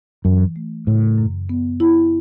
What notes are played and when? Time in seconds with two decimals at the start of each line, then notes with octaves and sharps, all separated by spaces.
0.24 F#2 E3
0.56 A3
0.87 A2 C#3
1.18 F#2
1.49 B3
1.80 E4